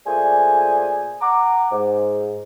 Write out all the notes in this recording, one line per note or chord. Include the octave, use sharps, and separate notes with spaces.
A#2 A3 G#4 C5 D5 G#5
F#5 A#5 D6
G#2